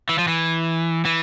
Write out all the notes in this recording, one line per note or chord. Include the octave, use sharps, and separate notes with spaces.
E3
F3
E3
E3